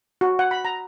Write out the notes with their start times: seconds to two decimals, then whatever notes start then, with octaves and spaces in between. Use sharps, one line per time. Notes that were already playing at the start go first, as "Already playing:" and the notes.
0.21 F#4
0.39 F#5
0.51 B5
0.65 A#5